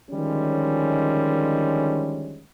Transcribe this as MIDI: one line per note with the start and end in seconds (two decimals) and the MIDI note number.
0.10 2.43 50
0.10 2.43 51
0.10 2.43 53
0.10 2.43 55
0.10 2.43 56
0.10 2.43 61